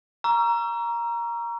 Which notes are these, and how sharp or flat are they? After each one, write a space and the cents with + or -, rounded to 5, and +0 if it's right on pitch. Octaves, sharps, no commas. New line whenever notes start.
A#5 +10 C#6 +35 E6 +45